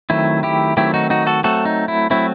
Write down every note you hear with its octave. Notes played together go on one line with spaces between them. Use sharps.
D#3 F#3 A3 C4 E4
E4 G4
D#3 F#3 A3 C4 E4 G4
D#4 F#4
D#4 F#4
F#4 A4
F#3 A3 C4 F#4 A4
D#4
E4
F#3 A3 C4 E4